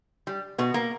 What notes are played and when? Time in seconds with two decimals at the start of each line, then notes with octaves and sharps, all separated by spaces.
0.27 G3
0.58 B2 B3
0.74 A#3